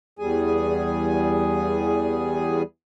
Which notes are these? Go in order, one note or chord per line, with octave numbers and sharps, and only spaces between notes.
E2 G3 G#4 G#5